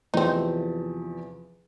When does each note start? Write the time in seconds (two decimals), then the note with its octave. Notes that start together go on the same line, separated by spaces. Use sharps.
0.14 E2 C3 F3 C4 D#4